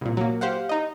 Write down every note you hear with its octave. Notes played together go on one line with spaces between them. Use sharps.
C2 A#2
F#3 A#3
G4 C5 F5 F#5
D#4 D#5